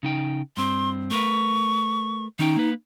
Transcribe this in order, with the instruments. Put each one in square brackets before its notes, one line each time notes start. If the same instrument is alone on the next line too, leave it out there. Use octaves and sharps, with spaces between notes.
[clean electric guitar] C#3 D#4 G5
[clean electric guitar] G2 C4 [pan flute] C6
[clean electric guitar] A3 A#4 B4 [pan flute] C#6
[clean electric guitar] D#3 C#4 G5 [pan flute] D#4
[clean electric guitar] A#3 B4